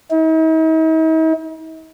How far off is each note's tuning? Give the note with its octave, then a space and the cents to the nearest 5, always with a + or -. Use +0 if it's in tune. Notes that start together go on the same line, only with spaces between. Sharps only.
D#4 +45